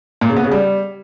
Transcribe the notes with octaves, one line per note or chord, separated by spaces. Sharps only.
A#2
C#3
B3
C#3
G3